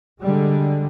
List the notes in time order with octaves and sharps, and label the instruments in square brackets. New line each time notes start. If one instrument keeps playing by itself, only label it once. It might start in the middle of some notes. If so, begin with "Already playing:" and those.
[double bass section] D3 G3 G#3